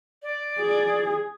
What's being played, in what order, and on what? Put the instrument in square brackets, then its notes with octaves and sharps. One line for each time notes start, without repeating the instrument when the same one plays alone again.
[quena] D5
[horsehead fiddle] G#4